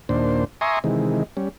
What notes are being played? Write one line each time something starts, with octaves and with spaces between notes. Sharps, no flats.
D#2 A#2 D4 C5
E5 G#5 A#5 C6 C#6 D#6
C3 D#3 E3 G#3
G3 C#4